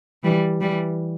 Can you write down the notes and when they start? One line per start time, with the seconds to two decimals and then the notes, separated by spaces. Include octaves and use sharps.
0.23 E3 G3
0.61 E3 G3